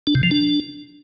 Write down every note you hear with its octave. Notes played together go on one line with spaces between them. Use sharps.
D4
C3
F3
D4